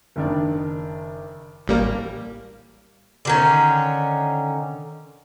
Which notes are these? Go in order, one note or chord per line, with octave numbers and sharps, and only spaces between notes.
F#1 D#3 D4
A1 G3 A#3
D3 D#3 C#4